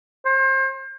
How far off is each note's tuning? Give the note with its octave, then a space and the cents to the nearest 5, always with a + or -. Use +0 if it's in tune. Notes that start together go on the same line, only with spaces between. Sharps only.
C5 +35